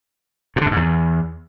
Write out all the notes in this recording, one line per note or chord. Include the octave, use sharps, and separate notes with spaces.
A#2
D3
F#2
G#2
E2